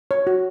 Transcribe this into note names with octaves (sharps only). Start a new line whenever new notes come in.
C#5
F#4